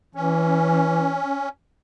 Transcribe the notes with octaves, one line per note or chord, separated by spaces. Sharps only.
E3 C#4